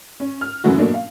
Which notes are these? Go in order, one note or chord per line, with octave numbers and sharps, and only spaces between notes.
C#4
F6
F#2 C#3 E3 F#3 A3 F#4
B2 F#3 A3 A#3 D4
F5